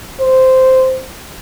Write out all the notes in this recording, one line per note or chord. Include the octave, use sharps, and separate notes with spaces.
C5